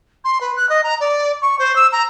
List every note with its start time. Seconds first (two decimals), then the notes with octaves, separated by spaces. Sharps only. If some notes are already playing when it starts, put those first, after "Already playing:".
0.24 C6
0.41 B4
0.56 F#6
0.69 D#5
0.83 A#5
1.00 D5
1.41 C#6
1.59 C5
1.75 E6
1.92 A#5